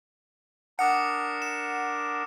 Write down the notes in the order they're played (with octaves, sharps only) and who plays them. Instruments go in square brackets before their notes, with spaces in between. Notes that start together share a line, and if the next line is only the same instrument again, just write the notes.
[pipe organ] D4 A#4 [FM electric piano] F#5 [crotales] D6 D#6 C#7
[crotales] E7